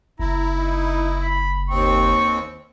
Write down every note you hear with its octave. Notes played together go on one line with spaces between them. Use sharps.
F#1 E4 A#5
D#4
B5
D#2 C4 C#6